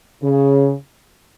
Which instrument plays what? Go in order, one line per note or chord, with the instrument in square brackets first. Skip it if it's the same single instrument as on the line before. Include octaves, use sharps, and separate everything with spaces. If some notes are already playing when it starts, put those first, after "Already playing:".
[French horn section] C#3